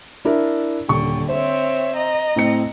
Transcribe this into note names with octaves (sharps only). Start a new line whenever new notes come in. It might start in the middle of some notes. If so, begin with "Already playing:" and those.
D4 E4 A#4
D#1 D3 G5 C#6
C4 C5 C#5 E5
D#5 A#5
A2 C4 C#7